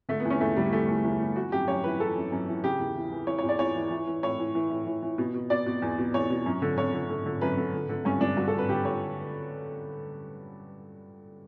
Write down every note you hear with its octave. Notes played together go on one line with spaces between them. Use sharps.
D3 A3
B3
E2
C#4
E2 A3
D3 G3
E2 A3
E2
E2
E2
E3 F#4
F#2 G4
F#2 C#5
E3 B4
E3 A4
F#2
F#2
E3
C#3 G4
E2
E3
E3
E3 C#5
C#5
E2
D5
E2 C#5
E3
E3
E3
A2 C#5
E3
E3
A2
E3
E3
B2
B2
B2 D5
B2
E2
B2
E2 C#5
B2
F#2
D3
D3 C#5
D3
D3
D3
F#2 B4
D3
D3
D3
G2 C#4
G2 D4
G2 F#4
A4
D3
B4
D3 G4
D3 C#5